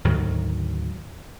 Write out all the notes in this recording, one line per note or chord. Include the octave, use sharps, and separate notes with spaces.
D2 G#2 D#3 F#3